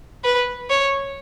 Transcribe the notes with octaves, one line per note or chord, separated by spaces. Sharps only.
B4
C#5